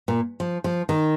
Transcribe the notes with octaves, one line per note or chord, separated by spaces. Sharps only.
A#2
F3
F3
D#3